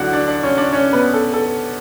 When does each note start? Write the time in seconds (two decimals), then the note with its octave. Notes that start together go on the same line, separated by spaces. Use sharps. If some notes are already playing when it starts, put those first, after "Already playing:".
Already playing: D2 D3 F#3 D4 E4 F#4 D5 F#5
0.13 D4 D5
0.28 D4 D5
0.43 C#4 C#5
0.57 D4 D5
0.73 C#4 C#5
0.93 B3 B4
1.14 A4
1.33 A4